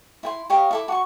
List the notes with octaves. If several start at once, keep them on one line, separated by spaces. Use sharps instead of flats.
E4 G5 C6
G4 C#5 D#5 F5
E4 A4 D6
F#4 C#6